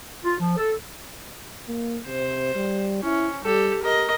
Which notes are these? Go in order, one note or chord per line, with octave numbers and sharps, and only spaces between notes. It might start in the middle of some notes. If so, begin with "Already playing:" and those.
F4
F3
A4
A#3
C3 C5
G3
C#4 E4
G3 G4 A4
G4 A#4 D#5